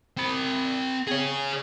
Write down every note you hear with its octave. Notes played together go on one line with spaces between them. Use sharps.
C4 B5
G#4 C#5